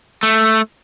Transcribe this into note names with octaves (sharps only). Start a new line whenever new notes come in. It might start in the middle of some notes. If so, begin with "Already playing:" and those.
A3